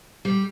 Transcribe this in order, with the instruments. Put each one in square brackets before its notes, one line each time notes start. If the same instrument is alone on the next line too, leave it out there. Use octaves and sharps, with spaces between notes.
[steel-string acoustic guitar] G3